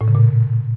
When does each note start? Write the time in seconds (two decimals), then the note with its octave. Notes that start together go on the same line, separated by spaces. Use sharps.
0.01 A2
0.08 C#3
0.15 A#2